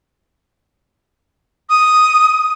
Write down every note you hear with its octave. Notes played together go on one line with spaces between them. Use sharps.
D#6